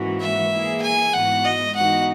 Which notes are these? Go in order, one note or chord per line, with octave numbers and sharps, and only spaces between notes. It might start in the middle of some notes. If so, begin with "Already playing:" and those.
Already playing: G#2 E3 A#3 C#4 F#4
E5
E3 A#3 E4 G#4
G#5
G#2 E3 B3 F#4 F#5
D#5
G#2 E3 B3 D#4 F#4 F#5